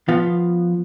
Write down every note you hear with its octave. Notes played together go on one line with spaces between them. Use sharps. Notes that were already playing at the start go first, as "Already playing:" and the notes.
F3 B3 F4 F5